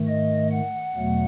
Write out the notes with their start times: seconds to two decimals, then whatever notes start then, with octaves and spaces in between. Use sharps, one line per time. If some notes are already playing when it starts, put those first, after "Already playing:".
Already playing: G#2 D#3 A3
0.08 D#5
0.52 F#5
0.96 E2 B2 F#3 A3